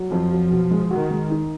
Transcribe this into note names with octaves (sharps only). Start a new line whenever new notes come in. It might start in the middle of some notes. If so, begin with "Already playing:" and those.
Already playing: F#3
F2 F3
F#3
B2
G#3
D#3 F#4
G#3
D#4